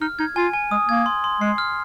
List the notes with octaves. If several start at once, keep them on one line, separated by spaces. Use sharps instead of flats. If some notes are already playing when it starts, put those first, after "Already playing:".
D#4 F6
D#4 G#6
F4 G#5
G#5
G#3 D#6
A#3 G#6
C6
C6
G#3 C7
F6